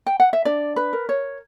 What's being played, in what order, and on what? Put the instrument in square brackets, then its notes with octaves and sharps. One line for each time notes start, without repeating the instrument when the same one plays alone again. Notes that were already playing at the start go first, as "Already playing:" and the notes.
[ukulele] G5
F#5
E5
D4 D5
B4
A#4
C#5